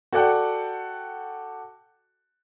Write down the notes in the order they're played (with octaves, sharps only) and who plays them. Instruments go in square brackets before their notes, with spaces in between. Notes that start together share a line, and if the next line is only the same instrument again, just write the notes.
[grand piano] F#4 A4 D5 F#5 G5